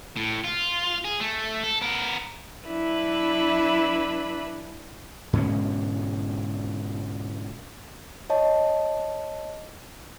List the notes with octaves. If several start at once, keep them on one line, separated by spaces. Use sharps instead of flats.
A2
F4
G#4
A3
A4
B3 A#4
F#3 D4 E4 B4 E5
G#2 B2 D3 C#4
C#5 D#5 A5